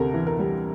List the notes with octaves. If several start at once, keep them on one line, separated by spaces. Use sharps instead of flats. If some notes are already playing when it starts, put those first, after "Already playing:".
Already playing: D2 C3 A4 A#4
E3
A#4
G3